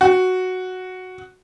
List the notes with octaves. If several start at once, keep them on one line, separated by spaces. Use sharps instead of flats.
F#4